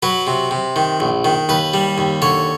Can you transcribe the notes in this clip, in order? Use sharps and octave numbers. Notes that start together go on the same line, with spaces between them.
F#3 B4
C3
C3
D#3
A#1
D#3
D#2 B4
G3
D#2
D3 C#5